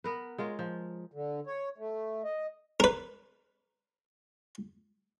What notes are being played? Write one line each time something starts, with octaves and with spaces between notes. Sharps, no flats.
B3 A#4 B4
G#3 F4 A#4 C#5
F3
D3
C#5
A3
D#5
A#4 B4